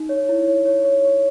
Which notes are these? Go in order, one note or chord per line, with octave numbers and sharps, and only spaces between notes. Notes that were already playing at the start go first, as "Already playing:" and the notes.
Already playing: D#4
C#5
E4
C#5
C#5
C#5
C#5